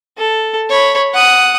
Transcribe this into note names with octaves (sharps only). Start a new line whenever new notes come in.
A4
C#5 B5
F#5 D#6